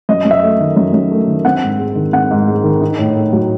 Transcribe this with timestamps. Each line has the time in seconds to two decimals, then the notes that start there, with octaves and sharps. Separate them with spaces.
0.09 F#2 D#5
0.25 F#2
0.31 E5
0.43 A3
0.60 D#3
0.76 F#2
0.93 F#2
1.11 A3
1.27 D#3
1.45 C4 F#5
1.63 G#2
1.79 G#3
1.96 D#3
2.13 C4 F#5
2.31 G#2
2.48 G#3
2.64 D#3
2.81 D#4
2.99 A2
3.15 A3
3.33 F#3